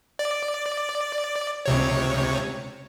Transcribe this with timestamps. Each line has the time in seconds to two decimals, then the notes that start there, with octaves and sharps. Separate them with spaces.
0.19 D5
1.66 C#2 C3 C#5